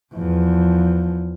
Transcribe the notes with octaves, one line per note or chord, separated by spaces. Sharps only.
E2 F3